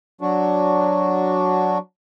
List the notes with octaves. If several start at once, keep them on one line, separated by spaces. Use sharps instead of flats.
F#3 D4 F#4